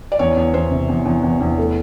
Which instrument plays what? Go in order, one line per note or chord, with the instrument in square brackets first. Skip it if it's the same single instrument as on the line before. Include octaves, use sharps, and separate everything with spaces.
[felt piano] D5
E2 C#5
E2
E2 C5
C3
E2
E2
E2
E2
A3